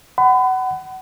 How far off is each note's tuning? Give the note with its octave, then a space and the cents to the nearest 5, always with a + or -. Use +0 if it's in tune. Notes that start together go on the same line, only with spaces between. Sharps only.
F#5 +25 B5 +35